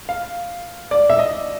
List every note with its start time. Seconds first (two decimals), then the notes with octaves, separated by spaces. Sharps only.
0.09 F5
0.91 D5
1.10 E5
1.19 D#5